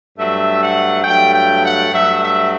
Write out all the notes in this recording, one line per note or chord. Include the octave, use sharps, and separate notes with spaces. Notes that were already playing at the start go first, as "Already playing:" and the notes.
G2 F#3 A3 E5
F#5
G2 F#3 A3 G5
G5
F#5
G2 F#3 A3 E5
E5